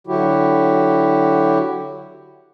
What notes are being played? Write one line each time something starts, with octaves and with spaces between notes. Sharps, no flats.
D3 F#3 E4 F#4 G4